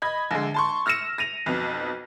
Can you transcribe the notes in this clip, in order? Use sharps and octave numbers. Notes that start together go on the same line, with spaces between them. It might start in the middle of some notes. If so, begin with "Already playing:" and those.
D#5 B5 G#6
A#1 D3 G#3
A5 C6 C#6
E6 F6 A#6 C#7 E7
A#6 D#7 F7
B1 F2 B2